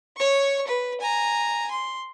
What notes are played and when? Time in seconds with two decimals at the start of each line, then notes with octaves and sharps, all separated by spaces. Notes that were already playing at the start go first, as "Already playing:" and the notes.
0.17 C#5 C#6
0.67 B4
1.01 G#5 A#5
1.71 C6